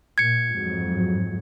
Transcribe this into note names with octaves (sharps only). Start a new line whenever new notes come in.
A#2 G#6 C#7
F2 G#2 F#3